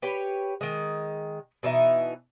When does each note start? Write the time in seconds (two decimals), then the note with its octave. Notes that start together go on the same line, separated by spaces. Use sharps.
0.02 G4 B4 C#5 G5
0.61 D#3 G#3
1.63 B2 E3 D#4 E5